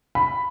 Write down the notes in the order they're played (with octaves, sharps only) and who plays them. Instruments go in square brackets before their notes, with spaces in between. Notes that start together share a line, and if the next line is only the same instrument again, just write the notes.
[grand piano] B5